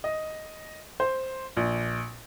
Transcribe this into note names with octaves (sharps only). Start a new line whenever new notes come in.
D#5
C5
A#1